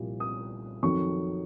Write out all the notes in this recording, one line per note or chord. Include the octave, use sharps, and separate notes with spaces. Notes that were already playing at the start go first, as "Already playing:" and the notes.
Already playing: C2 A#2 F3
D#6
F2 D#3 F#3 C#6